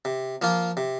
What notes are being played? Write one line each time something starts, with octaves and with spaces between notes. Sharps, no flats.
C3
F3 A#3 F4
C3